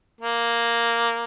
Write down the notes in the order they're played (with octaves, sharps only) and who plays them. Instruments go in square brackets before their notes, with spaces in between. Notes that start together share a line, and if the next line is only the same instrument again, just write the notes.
[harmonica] A#3